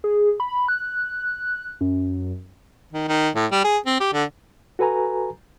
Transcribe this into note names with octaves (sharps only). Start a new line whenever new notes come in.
G#4
B5
F#6
F#2
D#3
D#3
A2
G3
G#4
C4
G4
D3
F#4 A4 B4 G#5 A#5